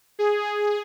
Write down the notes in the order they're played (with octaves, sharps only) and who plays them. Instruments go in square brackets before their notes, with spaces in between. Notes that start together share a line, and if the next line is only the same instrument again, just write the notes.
[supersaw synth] G#4